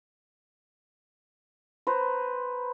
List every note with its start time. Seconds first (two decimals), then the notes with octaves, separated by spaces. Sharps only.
1.87 B4 C5 A#5